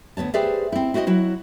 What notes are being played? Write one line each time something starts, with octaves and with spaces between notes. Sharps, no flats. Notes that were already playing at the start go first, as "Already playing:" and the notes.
D2 B3 C#5 A5
G4 G#4 B4 C5 D5 E5
C4 E4
E4 F#4 C5 D5 D#5
F#3 E4 F#4